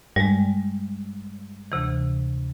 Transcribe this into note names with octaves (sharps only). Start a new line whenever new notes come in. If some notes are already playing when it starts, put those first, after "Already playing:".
G2 G3 G#3
D2 C3 E3